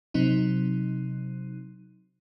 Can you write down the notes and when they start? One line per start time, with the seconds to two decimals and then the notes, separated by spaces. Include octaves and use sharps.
0.14 C3 F#3 C4 D#4